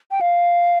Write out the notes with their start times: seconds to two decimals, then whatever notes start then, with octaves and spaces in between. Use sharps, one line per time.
0.11 G5
0.21 F5